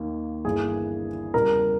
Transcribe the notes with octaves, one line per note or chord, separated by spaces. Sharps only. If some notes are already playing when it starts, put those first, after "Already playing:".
Already playing: D#2 D#3 A#3
G1 G2 E3 A#3 G#4 G#5
E2 C#3 G3 A#4 A#5